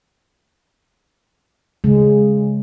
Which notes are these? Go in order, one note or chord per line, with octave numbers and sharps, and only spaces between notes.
C#3 G#3